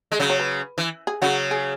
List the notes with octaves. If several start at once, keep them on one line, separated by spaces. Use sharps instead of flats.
G#3
C#3 F#3
C#5
B4
E3
G#4
C#3 F#3 F#4
G#4